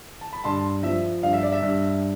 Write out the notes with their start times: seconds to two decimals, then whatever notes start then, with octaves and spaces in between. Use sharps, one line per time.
0.21 A5
0.33 B5
0.44 G2 A5 C6
0.83 F3 E5
1.23 G2 F5
1.33 E5
1.43 D5
1.52 E5
1.62 G2